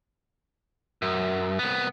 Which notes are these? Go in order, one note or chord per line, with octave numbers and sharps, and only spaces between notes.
F#2
C2 B3